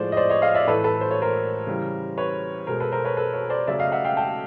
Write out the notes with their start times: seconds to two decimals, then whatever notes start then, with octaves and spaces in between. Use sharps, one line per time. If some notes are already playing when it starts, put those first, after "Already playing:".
Already playing: A2 F3 G#3 C5 D5
0.12 D#5
0.17 C5 D5
0.29 C#5 D#5
0.42 D#5 F5
0.54 D5 E5
0.67 A2 E3 A3 A4 B4
0.84 A4 B4
1.01 C5
1.11 C#5
1.22 A#4 C5
1.67 C#3 E3 G3
2.18 B4 C#5
2.67 B2 G#3 A#4 C5
2.80 A4 B4
2.92 A#4 C5
3.04 B4 C#5
3.17 A4 B4
3.33 B4 C#5
3.50 C5 D5
3.67 C#3 F#3 A3 D5 E5
3.80 D#5 F5
3.92 E5 F#5
4.05 F5 G5
4.17 G5 A5